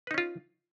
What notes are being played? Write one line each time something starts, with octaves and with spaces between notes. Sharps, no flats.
C#4 D#4 F4 B4